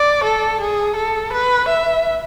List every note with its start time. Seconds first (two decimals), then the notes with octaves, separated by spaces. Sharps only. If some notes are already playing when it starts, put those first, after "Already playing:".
Already playing: D5
0.24 A4
0.61 G#4
0.96 A4
1.33 B4
1.69 E5